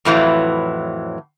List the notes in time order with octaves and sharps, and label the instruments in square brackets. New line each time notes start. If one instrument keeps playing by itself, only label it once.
[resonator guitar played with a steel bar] F2 A2 E3 F#3